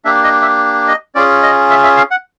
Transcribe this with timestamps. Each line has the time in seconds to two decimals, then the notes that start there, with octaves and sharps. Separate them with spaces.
0.05 A#3 D4 G4 E5
0.24 D#5
0.42 E5
0.88 D#5
1.15 C#4 F4 G#4 D5
1.43 D#5
1.70 E5
1.84 E5
1.97 F5
2.11 F#5